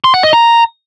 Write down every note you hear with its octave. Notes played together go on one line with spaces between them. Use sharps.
C6
F#5
D#5
A#5